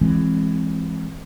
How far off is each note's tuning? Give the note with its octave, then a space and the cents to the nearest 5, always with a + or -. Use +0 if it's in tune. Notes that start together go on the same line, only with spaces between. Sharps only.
E3 +15 G#3 +0 C4 +20